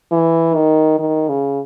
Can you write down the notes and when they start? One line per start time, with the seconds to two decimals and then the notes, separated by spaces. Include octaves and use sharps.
0.12 E3
0.55 D#3
0.99 D#3
1.29 C#3